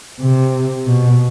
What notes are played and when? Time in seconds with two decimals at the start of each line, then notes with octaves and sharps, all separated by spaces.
0.20 C3
0.87 B2